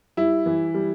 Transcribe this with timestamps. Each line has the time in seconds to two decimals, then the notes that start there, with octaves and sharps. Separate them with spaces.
0.17 G3 E4
0.46 E3
0.74 G3